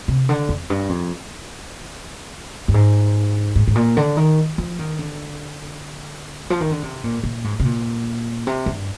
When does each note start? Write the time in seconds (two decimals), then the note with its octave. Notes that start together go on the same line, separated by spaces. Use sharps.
0.08 C3
0.29 D3
0.49 F2
0.70 G2
0.89 F2
2.68 G2
2.74 G#2
3.56 G#2
3.68 G#2
3.75 A#2
3.97 D3
4.17 D#3
4.58 F3
4.79 D#3
4.99 D3
6.50 F3
6.61 D#3
6.71 D3
6.83 C3
7.04 A#2
7.24 A#2
7.44 G#2
7.60 C3
7.65 A#2
8.47 C3
8.66 G2